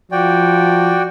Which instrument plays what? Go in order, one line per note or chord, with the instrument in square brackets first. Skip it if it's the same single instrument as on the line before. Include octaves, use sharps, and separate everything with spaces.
[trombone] F3 [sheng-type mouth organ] F#4 D5 [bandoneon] G5